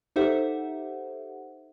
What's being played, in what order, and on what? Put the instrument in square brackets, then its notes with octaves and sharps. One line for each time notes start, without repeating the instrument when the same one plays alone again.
[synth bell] D#4 G4 A4 C5 E5 F#5